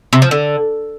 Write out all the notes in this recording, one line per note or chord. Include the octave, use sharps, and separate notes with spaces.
C3
F3
D3